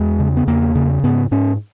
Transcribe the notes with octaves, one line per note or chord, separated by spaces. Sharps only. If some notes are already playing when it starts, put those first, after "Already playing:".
Already playing: E2 G#3
C#3
B3
E2 A#3
C#3
G#2 B3
G#2 C#4